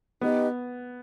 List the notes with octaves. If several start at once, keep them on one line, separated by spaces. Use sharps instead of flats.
B3 D#4 G4 B4 D#5